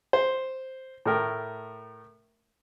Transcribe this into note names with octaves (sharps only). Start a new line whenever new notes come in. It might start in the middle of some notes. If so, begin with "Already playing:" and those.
C5
A2 A3 A#4 G5